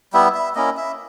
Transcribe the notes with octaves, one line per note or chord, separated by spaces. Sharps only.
G3 B3 E4 E5
E5
A#3 C#4 E4 D#5
E5